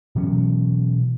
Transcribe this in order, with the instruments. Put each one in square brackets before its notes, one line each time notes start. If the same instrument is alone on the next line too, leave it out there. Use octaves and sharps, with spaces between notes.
[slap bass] B2 E3 F#3 C#4